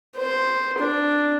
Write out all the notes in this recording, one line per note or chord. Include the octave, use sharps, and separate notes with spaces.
C5
D4